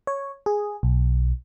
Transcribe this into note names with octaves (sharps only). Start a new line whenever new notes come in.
C#5
G#4
B1